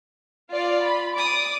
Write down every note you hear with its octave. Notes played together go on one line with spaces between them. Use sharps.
F4 D5 F5
B5
D5 D6 D#6